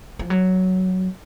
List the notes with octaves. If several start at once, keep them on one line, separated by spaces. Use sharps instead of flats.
F3
F#3